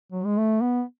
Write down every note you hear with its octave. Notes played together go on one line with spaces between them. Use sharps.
F#3
G#3
A3
B3